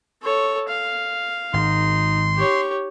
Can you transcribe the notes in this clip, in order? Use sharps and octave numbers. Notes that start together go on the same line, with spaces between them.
A4 C#5
F5
G#1 D#4 C6
G4 C#5